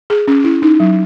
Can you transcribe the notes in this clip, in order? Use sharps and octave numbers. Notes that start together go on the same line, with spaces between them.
G#4
C#4
E4
D#4
F#3